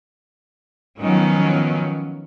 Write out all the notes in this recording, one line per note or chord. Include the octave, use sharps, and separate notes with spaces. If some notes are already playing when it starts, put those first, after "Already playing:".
D#3 F3 F#3 B3 C#4